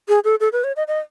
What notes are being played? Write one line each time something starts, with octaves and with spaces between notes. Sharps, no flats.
G#4
A4
A4
B4
C#5
D#5
D#5